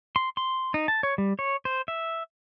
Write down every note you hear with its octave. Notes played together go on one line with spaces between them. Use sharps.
C6
C6
D#4
A5
C#5
G3
C#5
C5
E5